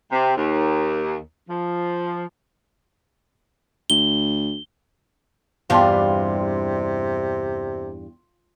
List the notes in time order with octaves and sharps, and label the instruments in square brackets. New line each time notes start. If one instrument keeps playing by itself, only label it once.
[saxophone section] C3
D#2
F3
[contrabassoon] D2 [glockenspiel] G7
[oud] E2 G2 G3 [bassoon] C3 [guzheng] F4 [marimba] F5 A5 C6